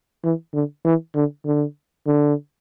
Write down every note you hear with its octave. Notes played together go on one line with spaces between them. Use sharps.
E3
D3
E3
D3
D3
D3